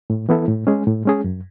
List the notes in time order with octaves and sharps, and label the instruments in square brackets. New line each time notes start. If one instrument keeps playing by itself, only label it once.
[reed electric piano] A2
E3 B3 E4 A4
A2
G#3 C#4 G#4
A2
G#3 C#4 G#4
F#2